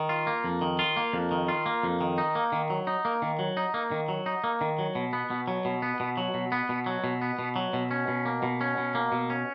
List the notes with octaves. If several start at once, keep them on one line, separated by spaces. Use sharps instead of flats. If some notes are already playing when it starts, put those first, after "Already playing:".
Already playing: D#3
F4
A#3
F2
D#3
F4
A#3
F2
D#3
F4
A#3
F2
D#3
D#4
A#3
D#3
F#3
D#4
A#3
D#3
F#3
D#4
A#3
D#3
F#3
D#4
A#3
D#3
F#3
B2
B3
B2
F#3
B2
B3
B2
F#3
B2
B3
B2
F#3
B2
B3
B2
F#3
B2
C#4
B2
A#3
B2
C#4
B2
A#3
B2
C#4